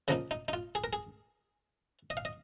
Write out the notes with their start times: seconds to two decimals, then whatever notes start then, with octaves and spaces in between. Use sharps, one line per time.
0.08 C#3 F3 A#3 D#4 D#5
0.31 D#4
0.48 D#4
0.53 F4
0.75 G#4
0.84 A#4
0.93 G#4
2.10 D#5
2.17 F5
2.25 D#5